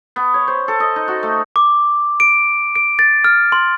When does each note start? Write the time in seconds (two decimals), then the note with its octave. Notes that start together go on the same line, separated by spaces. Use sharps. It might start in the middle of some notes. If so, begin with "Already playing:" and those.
0.16 B3
0.34 C#5
0.48 C5
0.68 A4
0.80 D#5
0.96 D#4
1.08 F#4
1.23 A3
1.56 D6
2.20 D7
2.75 D7
2.99 A6
3.24 F6
3.52 C6